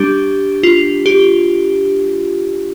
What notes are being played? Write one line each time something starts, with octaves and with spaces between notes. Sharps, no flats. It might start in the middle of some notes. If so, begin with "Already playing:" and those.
Already playing: G3 D4 G4
F4
G4